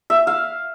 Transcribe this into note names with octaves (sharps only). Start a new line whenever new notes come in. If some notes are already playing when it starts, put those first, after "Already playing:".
E5
F5